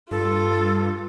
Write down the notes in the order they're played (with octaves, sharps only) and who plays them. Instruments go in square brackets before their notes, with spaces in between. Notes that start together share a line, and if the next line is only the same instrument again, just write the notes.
[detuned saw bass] G2 [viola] F4 [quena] A4